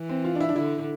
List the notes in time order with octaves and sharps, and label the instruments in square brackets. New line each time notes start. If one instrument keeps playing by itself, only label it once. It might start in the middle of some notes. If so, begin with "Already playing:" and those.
Already playing: [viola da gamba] E3
[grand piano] C4
F4
D4
E4
D4
[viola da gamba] D3 [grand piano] E4